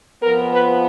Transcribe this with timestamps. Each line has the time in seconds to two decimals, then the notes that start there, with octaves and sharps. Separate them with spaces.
0.22 F2 F3 B3 A#4
0.52 B4